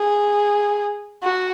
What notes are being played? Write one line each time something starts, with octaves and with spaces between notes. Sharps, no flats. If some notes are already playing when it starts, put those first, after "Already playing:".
Already playing: G#4
F#4